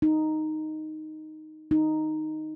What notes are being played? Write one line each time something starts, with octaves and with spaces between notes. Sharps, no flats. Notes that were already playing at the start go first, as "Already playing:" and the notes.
D#4
D#4